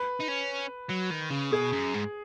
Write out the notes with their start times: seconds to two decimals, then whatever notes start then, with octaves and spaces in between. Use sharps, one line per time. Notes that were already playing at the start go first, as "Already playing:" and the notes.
Already playing: B4
0.20 D#4
0.28 C#4
0.90 F#3
1.11 D#3
1.31 C#3
1.52 B2 G#4
1.72 F#2
1.94 G#2